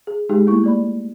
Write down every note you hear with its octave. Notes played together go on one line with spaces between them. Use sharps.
G#4
G#3 D#4 G4 G#4
A3 A#3 E4 C#6
A#3 D5 B5